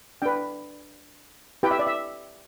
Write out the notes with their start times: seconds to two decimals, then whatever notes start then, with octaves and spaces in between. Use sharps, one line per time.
0.22 D4 B4 G5
1.63 E4 G4 B4 G5
1.71 E5
1.79 D5
1.87 E5